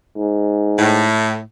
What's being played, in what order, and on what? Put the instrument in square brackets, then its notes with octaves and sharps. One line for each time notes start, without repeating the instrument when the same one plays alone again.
[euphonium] G#2
[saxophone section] A2